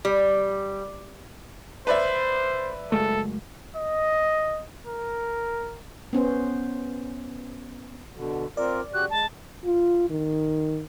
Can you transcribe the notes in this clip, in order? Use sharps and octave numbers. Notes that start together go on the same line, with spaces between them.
G3
B4 C5 D5 E5
F#1 G#3 A3 A4
D#5
A#4
B3 C#4 C5
B2 D3
C4 F4 A#4 D5
C#3 F#4 G4 F#6
G#3 A5
F4
D#3